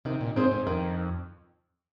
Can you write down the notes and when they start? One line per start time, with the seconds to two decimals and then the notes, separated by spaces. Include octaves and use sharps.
0.05 C3 D#3
0.21 A#2
0.36 G#2 C4 G#4 C5
0.51 G#2
0.67 F2 D#3